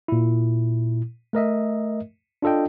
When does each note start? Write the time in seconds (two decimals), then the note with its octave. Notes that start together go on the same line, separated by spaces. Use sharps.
0.08 A#2 E4
1.33 A3 A#4 D#5 E5
2.42 D4 F4 A4 D#5 G5